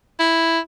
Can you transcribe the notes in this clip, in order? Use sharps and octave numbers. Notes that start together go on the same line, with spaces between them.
E4